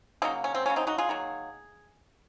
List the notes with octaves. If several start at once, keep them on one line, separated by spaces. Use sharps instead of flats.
C#3 F#3 A#3 C4 D#4
C#4
C4
C#3 F#3 A#3 C#4
C4 D#4
D#4 F#4
F4 G#4
D#3 F#3 A#3